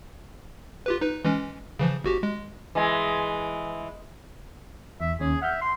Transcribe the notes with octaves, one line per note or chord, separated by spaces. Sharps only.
F4 G4 B4
D#4 B4
E3 G#3 C#4
C#3 E3 F3
G1 F#4 G4
G#3
E3 G#3
E2 E5
D#2 C#4 G#4
E5 F#5 F6 G6
C6